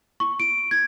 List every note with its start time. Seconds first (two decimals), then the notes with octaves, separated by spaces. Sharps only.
0.20 C#6
0.40 D7
0.71 G#6